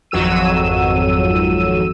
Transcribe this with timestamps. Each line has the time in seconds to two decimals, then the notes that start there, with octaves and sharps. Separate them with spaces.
0.11 G#1 F2 F#3 E6 D#7